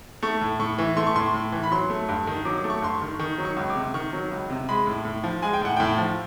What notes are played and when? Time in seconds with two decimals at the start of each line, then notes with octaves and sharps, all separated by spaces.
0.23 A3 C#6
0.41 A2
0.60 A2 C#6
0.78 E3
0.97 A3 C6
1.07 C#6
1.16 A2 C6
1.34 A2
1.52 E3
1.63 B5
1.72 F#3 C6
1.90 A3
2.09 G2
2.27 D#3
2.45 F#3 D6
2.58 D6
2.64 A3
2.70 C#6
2.82 G2 C6
2.94 C#6
3.01 D#3
3.19 D#3 C#6
3.38 F#3
3.45 C#6
3.56 C#2
3.70 D6
3.75 C3
3.94 D#3 C#6
4.13 F#3
4.31 C#2
4.50 C3
4.69 G#3 B5
4.87 A2
5.05 A2
5.24 F3
5.42 G#3 G#5
5.53 G5
5.61 A2 F#5
5.77 A2 G5
5.98 F3